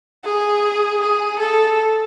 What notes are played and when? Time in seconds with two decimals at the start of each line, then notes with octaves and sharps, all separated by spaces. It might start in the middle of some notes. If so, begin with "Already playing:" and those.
0.24 G#4
1.01 G#4
1.39 A4